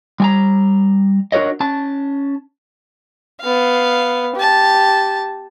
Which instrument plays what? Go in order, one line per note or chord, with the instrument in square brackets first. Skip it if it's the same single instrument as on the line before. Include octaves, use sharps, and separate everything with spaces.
[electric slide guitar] G3 G#5 A#5
D4 F#4 A#4 C#5 D#5
C#4 A5
[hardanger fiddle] B3 F5
G4 A5